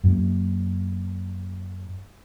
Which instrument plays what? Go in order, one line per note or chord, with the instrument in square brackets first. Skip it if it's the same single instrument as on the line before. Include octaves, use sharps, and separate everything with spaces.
[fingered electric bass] F#2 A#3